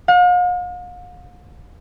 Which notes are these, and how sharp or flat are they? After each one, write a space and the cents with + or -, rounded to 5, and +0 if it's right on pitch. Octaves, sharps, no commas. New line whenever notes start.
F5 +45